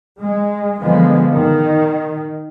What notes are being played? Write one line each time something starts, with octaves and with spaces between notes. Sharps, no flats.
G#3
D3 F3 G#3 B3
D#3